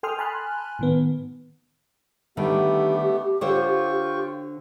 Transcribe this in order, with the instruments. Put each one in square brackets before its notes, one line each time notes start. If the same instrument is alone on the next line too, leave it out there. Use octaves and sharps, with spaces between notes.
[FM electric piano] A4 G5 G#5 C6 D#6 F6
G#5 A5 B5 C6 F6 F#6
A2 D#3 B3
[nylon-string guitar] D3 D#3 G3 [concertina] A3 B3 [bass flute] G4
[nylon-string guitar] D3 C5 C#5 [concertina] F4 G5 C#6